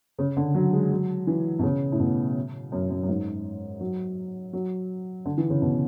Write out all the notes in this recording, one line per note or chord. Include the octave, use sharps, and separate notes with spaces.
C#3
D3
F#3
G#3
F#3
E3
B2
C#3
A2
B2
F#2
F#2
F#2
G#2
F#3
F#3
D3
E3
C#3
B2